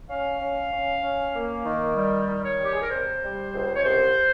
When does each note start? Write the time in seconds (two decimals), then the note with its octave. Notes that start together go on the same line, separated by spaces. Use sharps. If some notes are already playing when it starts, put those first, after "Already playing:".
0.08 C#4 F5
0.40 C#4
0.71 C#4
1.02 C#4
1.33 A#3
1.65 D#3
1.96 G3
2.28 D#3
2.43 C#5
2.59 G3
2.64 G4
2.73 G#4
2.81 A#4
2.89 C3 C5
3.21 G3
3.52 C#2
3.74 C#5
3.84 C2 C5